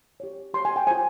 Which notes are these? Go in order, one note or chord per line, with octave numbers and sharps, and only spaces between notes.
G4 C#5
G4 C#5 C6
G#5
G5
F4 G#4 C5 G#5